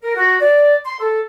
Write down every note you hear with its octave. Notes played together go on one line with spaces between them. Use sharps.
A#4
F#4
D5
C6
A4